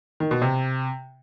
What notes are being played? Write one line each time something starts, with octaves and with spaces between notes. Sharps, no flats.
D#3
B2
C3